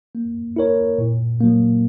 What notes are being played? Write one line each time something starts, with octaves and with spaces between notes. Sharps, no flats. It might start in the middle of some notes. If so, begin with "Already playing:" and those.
A#3
E4 A#4 C#5
A#2
F#3 A#3